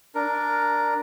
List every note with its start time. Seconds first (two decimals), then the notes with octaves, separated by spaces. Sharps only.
0.15 D4 A#4